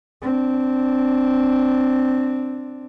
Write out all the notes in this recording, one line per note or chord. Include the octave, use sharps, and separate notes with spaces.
C4 D4